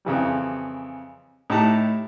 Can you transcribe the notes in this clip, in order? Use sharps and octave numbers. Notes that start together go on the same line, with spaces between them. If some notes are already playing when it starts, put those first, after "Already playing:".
F2 C#3 E3 G3
A2 D#4 G4 A5 A#5 F#6